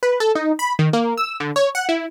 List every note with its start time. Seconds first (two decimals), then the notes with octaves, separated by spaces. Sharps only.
0.03 B4
0.20 A4
0.35 D#4
0.59 B5
0.79 D#3
0.93 A#3
1.18 E6
1.40 D3
1.56 C#5
1.75 F#5
1.89 E4